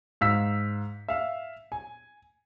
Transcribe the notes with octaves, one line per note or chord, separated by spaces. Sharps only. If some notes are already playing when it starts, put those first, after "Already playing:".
G#2 F5 E6 B6
E5 F5
G#5